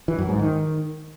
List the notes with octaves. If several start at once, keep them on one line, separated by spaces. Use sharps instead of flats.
E3
F#2
G#2
D#3